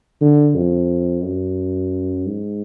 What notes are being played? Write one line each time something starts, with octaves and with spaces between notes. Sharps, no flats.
D3
F2
F#2
G#2